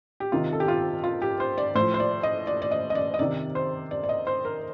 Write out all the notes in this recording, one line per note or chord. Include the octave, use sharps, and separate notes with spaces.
G4
C3 D#3 F4
A4
G4
F4
F4
G4
C5
D5
A2 F3 C5
C5
D5
D#5
D5
D5
D#5
D#5
D5
D#5
C3 D#3 D5
C5
D5
D5
D#5
C5
A#4